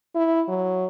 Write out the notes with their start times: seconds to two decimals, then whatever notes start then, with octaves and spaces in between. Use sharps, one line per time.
0.15 E4
0.48 F#3